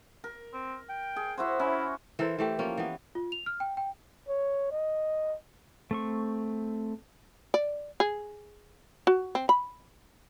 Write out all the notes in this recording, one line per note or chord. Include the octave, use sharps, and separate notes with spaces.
A#4
C4
G5
G#4
E4 F#4 C5
C#4 E4
E3 A4 A#4 C5
E3 A3 G4
F3 A#3 C#4
E3 B3
F4
F7
F6
G5
G5
C#5
D#5
A3 C4 C#6
D5
G#4
F#4
C4
B5